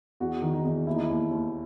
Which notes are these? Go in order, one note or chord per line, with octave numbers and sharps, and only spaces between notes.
E2 F#4
D#3
D#4
E2
D#2 E4
D#4
E4
D#2
D#2